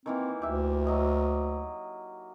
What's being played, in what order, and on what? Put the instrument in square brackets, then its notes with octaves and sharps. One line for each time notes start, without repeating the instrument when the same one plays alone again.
[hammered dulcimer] D#3 E3 A#3 [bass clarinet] C4
[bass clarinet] D2 [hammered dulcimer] G4 E5
[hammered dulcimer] F#3 D#5